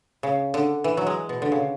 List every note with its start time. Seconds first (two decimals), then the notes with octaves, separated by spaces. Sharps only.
0.23 C#3
0.54 D3
0.84 E3
0.97 F#3
1.07 G#3
1.29 B2
1.42 D3
1.52 C#3